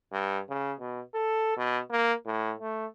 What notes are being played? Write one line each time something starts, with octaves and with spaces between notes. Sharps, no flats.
G2
C#3
B2
A4
B2
A#3
A2
A3